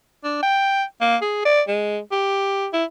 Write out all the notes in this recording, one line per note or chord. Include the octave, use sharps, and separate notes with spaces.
D4
G5
A#3
G#4
D5
G#3
G4
E4